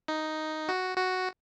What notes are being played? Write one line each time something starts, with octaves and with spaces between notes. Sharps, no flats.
D#4
F#4
F#4